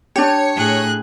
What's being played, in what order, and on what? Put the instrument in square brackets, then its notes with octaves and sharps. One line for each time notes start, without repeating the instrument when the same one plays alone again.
[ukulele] D4 G4 [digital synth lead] C#5
[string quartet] A2 G#4 F#6